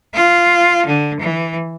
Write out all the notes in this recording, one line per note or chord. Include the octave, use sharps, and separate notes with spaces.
F4
D3
E3